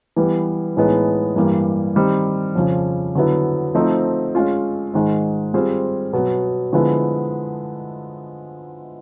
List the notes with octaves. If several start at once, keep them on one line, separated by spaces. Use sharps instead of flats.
E3 G3 B3
A2 E3 G#3 B3 D#4
G2 E3 G3 A#3
D#3 G3 C4
F2 C#3 F3
D3 F#3 B3 E4
F3 A3 C4 D#4
G#3 C#4 F4
G#2 D#3 G#3
G3 C4 F4 G#4 C5
B2 F#3 B3
D3 F3 G#3 B3 E4